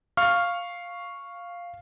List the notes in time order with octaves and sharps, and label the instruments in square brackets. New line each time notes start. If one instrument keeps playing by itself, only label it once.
[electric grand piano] F5 C#6 F6